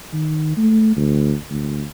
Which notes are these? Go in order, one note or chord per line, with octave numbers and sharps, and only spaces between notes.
D#3
A3
D2
D2